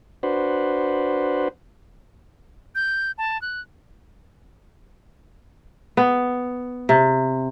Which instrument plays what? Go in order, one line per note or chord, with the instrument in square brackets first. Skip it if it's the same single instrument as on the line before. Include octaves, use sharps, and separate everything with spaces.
[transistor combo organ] D4 F#4 B4 C5
[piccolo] G6
A5
F#6
[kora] B3
C3